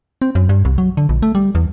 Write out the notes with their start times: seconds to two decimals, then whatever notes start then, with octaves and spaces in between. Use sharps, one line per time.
0.22 C4
0.35 F#2
0.49 G2
0.65 C2
0.78 F#3
0.97 D3
1.09 A#1
1.23 A3
1.35 G3
1.55 E2